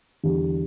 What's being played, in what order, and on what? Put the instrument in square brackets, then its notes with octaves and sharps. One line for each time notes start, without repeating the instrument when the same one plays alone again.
[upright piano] E2 D3 G3